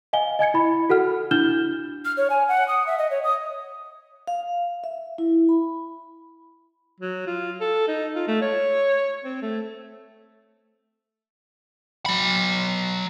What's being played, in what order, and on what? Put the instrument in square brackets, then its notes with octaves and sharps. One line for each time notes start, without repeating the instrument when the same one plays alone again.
[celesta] D#5 F5 G#5 G7
D#5 G#5 G#6 C#7
E4 B5
F#4 A4 F#5 F6
D4 E4 F6 G6 E7 G7
[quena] F6
C#5
G#5
F#5
D#6
E5
D#5
C#5
D#6
[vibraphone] F5
E5
E4
B5
[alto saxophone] F#3
F4
A4
D#4
F4
A3
C#5
C4
A3
[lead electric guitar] F#3 B5